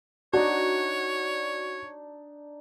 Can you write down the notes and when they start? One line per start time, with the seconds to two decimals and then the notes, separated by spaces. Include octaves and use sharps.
0.33 D4 D#4 F#4 C#5